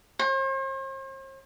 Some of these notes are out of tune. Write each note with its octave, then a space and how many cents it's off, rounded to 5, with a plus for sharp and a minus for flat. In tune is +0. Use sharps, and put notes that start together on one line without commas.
C5 +45